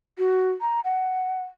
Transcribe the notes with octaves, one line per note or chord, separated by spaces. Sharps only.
F#4
A#5
F#5